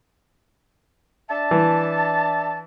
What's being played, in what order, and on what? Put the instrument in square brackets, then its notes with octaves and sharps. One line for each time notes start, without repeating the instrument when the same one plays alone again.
[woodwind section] D4 E5 A5
[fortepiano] E3